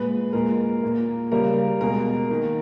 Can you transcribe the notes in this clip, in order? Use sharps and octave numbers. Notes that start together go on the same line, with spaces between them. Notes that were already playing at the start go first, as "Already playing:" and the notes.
Already playing: A#2 G#3 B4
A#2 G#3 A#4
A#2 A#3
C#3 G3 A#3 A#4
B2 G#3 A#4
D#3 A#3